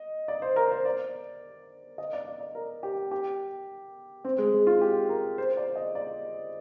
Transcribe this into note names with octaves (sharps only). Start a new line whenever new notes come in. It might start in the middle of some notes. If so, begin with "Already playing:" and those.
Already playing: D#5
D5
C5
A#4
C5
D5
D#5
D5
D5
D5
A#4
G4
G4
C4
G#3
G#3
F4
G4
A#4
C5
D5
D#5
D5